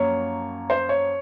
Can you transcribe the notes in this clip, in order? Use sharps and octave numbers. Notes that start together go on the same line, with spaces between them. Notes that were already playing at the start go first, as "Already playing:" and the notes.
Already playing: F#2 F3 A#3 C#5
C5
C#5